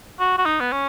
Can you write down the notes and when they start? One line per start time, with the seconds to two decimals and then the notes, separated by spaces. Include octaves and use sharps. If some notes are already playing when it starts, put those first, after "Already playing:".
0.19 F#4
0.38 F#4
0.46 D#4
0.60 B3
0.72 C#4